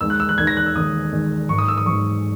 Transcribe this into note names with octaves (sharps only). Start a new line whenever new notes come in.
D#2 D#3 G#3 E6
F#6
E6
F#6
D#2 D#3 G#3 G#6
A#6
F#6
E6
D#2 D#3 G#3 D#6
D#2 D#3 G#3
G#2 F#3 C#6
D#6
E6
D#6
G#2 F#3 C#6